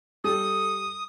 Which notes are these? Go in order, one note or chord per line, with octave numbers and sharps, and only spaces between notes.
G3 A4 D#6